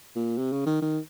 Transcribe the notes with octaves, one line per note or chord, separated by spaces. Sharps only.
A#2
C3
C#3
D#3
D#3